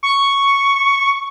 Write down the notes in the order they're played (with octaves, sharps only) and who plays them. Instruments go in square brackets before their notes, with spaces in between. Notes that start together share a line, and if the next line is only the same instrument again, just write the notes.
[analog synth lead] C#6